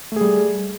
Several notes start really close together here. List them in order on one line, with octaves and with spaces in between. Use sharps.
A3 G#4 G3